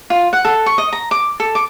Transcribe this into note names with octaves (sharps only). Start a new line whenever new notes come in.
F4
F#5
A4
C#6
D#5
A#5
D6
A4
D6